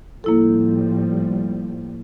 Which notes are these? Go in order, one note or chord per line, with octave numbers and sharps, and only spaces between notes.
A2 F3 G3 A#3 E4 A4